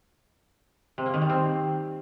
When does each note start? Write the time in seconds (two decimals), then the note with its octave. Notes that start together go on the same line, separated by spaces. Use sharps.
0.98 C3
1.06 A#3
1.14 D#3
1.22 G3
1.30 C4